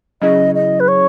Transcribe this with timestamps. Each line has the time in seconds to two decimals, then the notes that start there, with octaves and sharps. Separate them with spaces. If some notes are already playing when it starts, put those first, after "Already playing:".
0.21 C#3 F#3 C#4 E4 G#4 D#5
0.55 D#5
0.80 B4
0.88 C#5